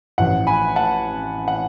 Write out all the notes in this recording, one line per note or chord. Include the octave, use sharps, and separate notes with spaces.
A1 A2 F3 F#5
G#5 B5
F#5 A5
F#5